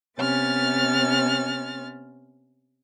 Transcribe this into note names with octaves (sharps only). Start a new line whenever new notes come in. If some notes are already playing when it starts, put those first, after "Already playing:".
C3 B3 C#4 F6 A6